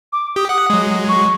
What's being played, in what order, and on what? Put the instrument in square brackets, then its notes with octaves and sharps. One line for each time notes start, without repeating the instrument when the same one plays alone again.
[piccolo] D6
[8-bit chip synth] G4 [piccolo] D#6
[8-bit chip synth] F#5 [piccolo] D#6
[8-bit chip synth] F#3 G#3
[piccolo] C#6